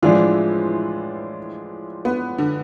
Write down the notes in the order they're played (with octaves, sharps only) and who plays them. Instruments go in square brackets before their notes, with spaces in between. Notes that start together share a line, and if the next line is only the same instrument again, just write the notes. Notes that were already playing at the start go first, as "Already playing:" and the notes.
[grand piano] A2 F3 G#3 D4 F4 [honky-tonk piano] E3
[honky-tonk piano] B3
D3